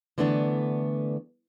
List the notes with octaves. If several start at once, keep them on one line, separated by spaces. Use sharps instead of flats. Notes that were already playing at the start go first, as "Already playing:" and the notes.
D3 E3 A3 B3 C#4 D4